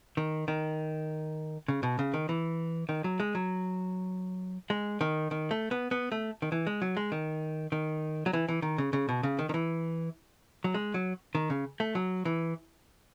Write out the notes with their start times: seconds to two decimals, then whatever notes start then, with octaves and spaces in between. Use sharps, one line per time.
0.17 D#3
0.48 D#3
1.68 C#3
1.83 B2
1.99 C#3
2.14 D#3
2.29 E3
2.89 D#3
3.04 F#3
3.20 G#3
3.35 F#3
4.70 G#3
5.01 D#3
5.31 D#3
5.51 A3
5.71 B3
5.91 B3
6.12 A3
6.42 D#3
6.52 E3
6.67 G#3
6.82 F#3
6.97 G#3
7.12 D#3
7.72 D#3
8.26 F#3
8.33 E3
8.49 E3
8.62 D#3
8.78 C#3
8.93 C#3
9.09 B2
9.23 C#3
9.39 D#3
9.49 D#3
9.54 E3
10.64 F#3
10.74 G#3
10.94 F#3
11.35 D#3
11.50 C#3
11.80 A3
11.95 F#3
12.25 E3